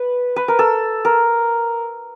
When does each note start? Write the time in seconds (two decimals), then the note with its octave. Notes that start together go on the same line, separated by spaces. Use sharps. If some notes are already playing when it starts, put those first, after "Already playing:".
Already playing: B4
0.36 B4
0.48 A#4
0.59 A4
1.05 A#4